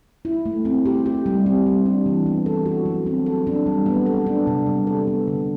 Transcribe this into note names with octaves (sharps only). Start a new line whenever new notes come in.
E4
A3
C4
G4
G4
G3
C4
G3
D4
E3
B3
A4
F#4
F#3
C4
A4
D4
G3
B3
A4
D4
C3
G3
A4
B3
D3